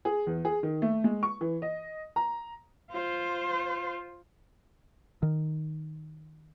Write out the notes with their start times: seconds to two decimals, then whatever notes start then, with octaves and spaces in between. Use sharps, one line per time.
0.05 G#4
0.27 E2
0.45 G#4
0.63 D#3
0.82 A3
1.04 G#3
1.23 C#6
1.41 E3
1.62 D#5
2.16 A#5
2.91 F4 C5
5.23 D#3